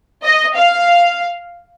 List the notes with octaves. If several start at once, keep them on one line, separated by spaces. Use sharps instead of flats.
D#5
F5